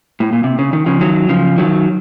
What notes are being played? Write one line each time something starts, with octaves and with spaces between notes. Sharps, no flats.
A2
A#2
C3
C#3
D#3
C#3 F3
D#3 F#3
C#3 F3
D#3 F#3